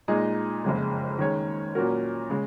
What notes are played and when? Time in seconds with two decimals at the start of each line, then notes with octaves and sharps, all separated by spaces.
0.08 A#2 G#3 D#4 G#4 D#5
0.64 F#1 F2 C#3 G#3
1.18 D#3 G#3 C#4 G#4 C#5
1.75 A#2 F#3 C#4 F#4 A#4
2.30 C#3 G#3